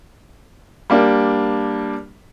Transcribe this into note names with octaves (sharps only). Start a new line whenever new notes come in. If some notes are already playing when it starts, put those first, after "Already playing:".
G3 A#3 D4